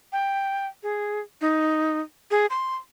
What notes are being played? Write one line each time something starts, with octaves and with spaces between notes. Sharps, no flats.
G5
G#4
D#4
G#4
C6